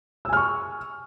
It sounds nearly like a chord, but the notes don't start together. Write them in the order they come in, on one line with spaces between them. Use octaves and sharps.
E6 G#5 F6 C#6